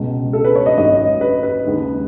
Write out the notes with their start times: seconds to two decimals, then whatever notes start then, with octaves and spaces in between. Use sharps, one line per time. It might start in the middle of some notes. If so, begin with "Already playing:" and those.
Already playing: C#2 B2 G#3 C#4
0.33 A4
0.44 B4
0.55 C#5
0.66 D#5
0.77 G#1 F#2 D#3 D#5
1.21 B4
1.43 B4
1.65 D#2 C#3 G#3 D#4